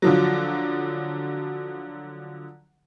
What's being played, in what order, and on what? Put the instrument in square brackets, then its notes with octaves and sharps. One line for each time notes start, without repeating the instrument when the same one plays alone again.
[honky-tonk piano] D3 F3 F#3